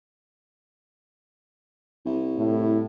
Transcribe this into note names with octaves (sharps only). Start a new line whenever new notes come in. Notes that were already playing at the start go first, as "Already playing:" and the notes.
C2
A2